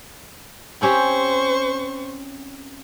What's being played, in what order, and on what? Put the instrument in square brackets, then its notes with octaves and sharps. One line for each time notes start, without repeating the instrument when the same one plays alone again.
[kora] C4 C#4 G4 [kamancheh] C5 C#6